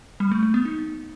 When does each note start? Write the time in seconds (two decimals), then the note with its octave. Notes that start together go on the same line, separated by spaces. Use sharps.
0.20 G3
0.31 A3
0.43 A3
0.54 B3
0.65 D#4